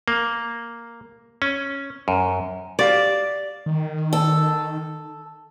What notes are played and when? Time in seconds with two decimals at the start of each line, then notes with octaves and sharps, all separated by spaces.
0.08 A#3
1.42 C#4
2.08 F#2
2.79 F#4 G4 D5 F5
3.66 D#3
4.13 A4